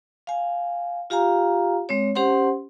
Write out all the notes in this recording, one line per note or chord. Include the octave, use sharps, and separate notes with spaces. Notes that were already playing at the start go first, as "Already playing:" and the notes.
F5 G#5
F4 G4 F5 G#5 A#5
G#3 C4 C#5
C#4 G4 C5 F#5 C6